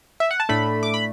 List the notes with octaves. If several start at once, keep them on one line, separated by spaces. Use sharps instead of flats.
E5
F#5
A5
A2 A3 D4 B5
D6
B5